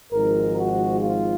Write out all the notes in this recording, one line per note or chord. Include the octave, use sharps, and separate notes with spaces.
G#1 G#2 F3 G#3 A#4
F#4
F4